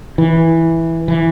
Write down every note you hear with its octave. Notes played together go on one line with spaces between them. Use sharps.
E3
E3